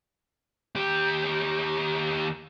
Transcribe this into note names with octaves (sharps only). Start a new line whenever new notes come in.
D#2 G4